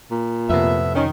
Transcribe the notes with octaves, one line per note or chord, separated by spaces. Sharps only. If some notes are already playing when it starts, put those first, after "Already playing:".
A#2
F2 A2 C3 B3 E5
D#3 C#4